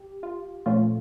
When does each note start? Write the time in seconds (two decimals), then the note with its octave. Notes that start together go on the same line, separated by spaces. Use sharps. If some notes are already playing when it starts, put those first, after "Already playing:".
Already playing: G4
0.23 F4
0.66 A#2 F3 A3 C#4 F4